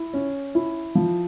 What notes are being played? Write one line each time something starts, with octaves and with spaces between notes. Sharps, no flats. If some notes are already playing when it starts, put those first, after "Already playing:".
Already playing: E4
C#4
E4
F3